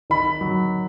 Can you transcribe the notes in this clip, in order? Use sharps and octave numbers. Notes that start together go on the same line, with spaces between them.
D#3 B5
F#3